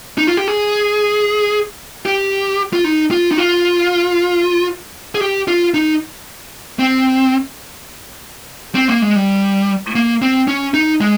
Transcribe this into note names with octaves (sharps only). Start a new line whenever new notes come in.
D#4
F4
G4
G#4
G4
F4
D#4
F4
D#4
F4
G#4
G4
F4
D#4
C4
C4
A#3
G#3
G3
A#3
C4
C#4
D#4
G#3